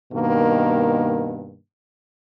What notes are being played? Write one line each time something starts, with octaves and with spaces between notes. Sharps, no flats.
G2 B2 D#3 A#3